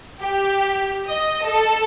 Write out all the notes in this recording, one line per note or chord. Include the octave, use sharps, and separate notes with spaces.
G4
D#5
A4